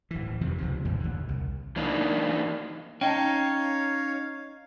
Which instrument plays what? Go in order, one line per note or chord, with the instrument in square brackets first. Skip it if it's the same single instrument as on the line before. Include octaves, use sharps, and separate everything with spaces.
[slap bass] D1 E3
F2 C3 D#3 E3
C#2 C3 F3
E2 A#2 E3 F3
D#2 D3
C2
[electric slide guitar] E3 A#3 D4 D#4
[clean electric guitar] C#4 D#4 [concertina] C#5 F5 [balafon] G5 A5